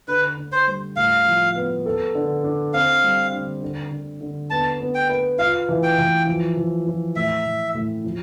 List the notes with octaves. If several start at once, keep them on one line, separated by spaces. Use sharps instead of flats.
D3 B4
D3
C5
G3
A2 F5
F3
B3
A4
D3
D4
C4 F5
G3
D3
D3
D3
D3
B3 A5
B3
G5
B4
F4 F5
E3
G5
E3
F3
F3
F3
A2 E5
A2
A2
F3